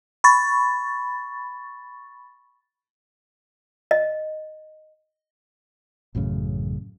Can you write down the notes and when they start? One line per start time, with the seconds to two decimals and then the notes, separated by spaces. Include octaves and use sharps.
0.24 B5 C#6 A6
3.91 D#5
6.15 A1 F#2 A2 C#3